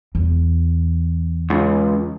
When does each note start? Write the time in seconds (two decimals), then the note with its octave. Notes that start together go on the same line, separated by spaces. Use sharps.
0.15 E2
1.50 C#2